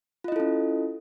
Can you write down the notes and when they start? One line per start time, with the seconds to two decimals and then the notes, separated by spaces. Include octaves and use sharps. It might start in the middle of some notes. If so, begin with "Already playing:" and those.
0.24 F4
0.28 D#5
0.32 E4
0.36 A4
0.40 C#4